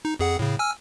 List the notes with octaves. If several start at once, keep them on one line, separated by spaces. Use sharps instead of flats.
D#4
F2 G#4 F#5
A2 C#3
G#5 E6 F6